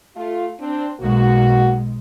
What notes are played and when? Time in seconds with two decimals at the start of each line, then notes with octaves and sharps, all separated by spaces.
0.16 A3 F4
0.60 C4 D4
1.00 B1 G#2 G#3 A#3 F#4